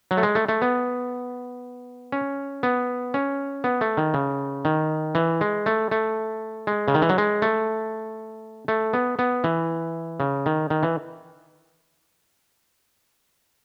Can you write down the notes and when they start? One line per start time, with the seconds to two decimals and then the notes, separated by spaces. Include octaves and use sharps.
0.11 F#3
0.17 A3
0.23 G#3
0.35 A3
0.49 A3
0.62 B3
2.12 C#4
2.63 B3
3.14 C#4
3.64 B3
3.81 A3
3.97 D#3
4.14 C#3
4.65 D#3
5.15 E3
5.41 G#3
5.66 A3
5.91 A3
6.67 G#3
6.88 C#3
6.94 D#3
7.02 E3
7.09 F#3
7.18 G#3
7.42 A3
8.68 A3
8.93 B3
9.19 B3
9.44 E3
10.20 C#3
10.46 D#3
10.70 D#3
10.83 E3